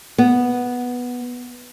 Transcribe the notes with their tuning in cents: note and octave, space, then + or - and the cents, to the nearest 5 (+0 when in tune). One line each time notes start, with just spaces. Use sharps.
B3 -5